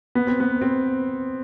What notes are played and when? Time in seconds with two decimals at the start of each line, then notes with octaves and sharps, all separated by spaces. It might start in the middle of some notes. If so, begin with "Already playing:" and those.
0.15 B3
0.27 C4
0.40 B3
0.62 C4